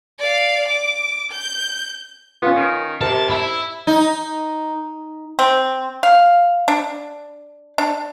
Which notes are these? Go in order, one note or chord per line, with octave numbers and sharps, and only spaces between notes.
D5 F5
D6
G6
B3 C#4 F4
D#3
C3 A#4 A5
E4 E5 B5
D#4
C4
F5
D4
D4